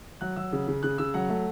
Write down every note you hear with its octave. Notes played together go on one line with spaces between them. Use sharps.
F#3 F#6
F#3 E6
C#3
C#3
C#3 F#6
C#3 E6
F#3 F#5
A3